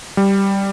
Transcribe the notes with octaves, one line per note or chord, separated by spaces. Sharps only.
G3